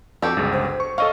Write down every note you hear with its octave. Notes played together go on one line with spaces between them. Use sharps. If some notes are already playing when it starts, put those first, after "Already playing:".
F2 F#4 G4 A4
G1 C#2 G#4
C5
C#6
C#4 A4 D#5 F5 C#6